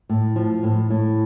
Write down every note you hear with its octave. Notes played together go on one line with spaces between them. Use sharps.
A2
F3
A2
A2